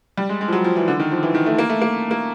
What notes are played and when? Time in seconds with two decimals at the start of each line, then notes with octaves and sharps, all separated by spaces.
0.18 G3
0.29 G#3
0.41 G#3
0.48 F3
0.53 F#3
0.64 F3
0.76 E3
0.88 D3
1.00 D#3
1.11 F3
1.23 E3
1.35 D#3
1.46 A3
1.58 A#3
1.69 A3
1.82 A#3
2.11 A#3